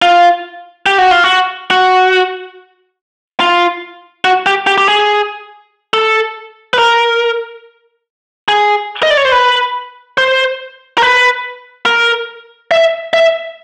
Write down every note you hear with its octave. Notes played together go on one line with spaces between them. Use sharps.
F4
G4
F#4
F4
F#4
F#4
F4
F#4
G4
G4
G4
G#4
A4
B4
A#4
G#4
D#5
D5
C#5
C5
B4
C5
A#4
B4
A#4
E5
E5